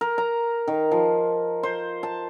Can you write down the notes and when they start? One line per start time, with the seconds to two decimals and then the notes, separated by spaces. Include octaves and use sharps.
0.01 A#4
0.18 A#5
0.68 D#3
0.91 F3
1.63 C5
2.03 A5